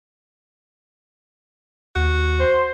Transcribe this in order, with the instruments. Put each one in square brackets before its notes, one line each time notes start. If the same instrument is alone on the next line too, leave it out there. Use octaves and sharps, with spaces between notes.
[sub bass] D#2 [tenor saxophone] F#4
[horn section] C5